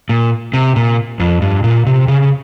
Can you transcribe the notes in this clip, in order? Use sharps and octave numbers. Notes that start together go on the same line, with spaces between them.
A#2
C3
A#2
F2
G2
A#2
C3
C#3